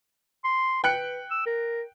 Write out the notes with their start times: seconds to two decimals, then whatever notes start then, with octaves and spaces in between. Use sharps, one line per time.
0.44 C6
0.84 B4 G5 F#6 C#7
1.31 E6
1.46 A#4